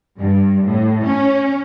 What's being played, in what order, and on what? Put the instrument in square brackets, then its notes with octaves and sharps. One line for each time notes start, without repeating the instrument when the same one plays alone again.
[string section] G2
A2
C#4